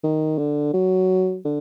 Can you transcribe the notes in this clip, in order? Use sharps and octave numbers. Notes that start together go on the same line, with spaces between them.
D#3
D3
F#3
D3